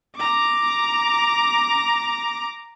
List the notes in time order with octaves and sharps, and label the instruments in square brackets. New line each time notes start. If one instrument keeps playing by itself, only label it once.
[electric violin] A#5 D6